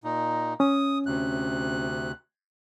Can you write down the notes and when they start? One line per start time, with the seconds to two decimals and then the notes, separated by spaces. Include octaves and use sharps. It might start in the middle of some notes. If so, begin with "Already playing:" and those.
0.04 A#2 D#4
0.60 C#4 D#6
1.06 D2 C3 F#6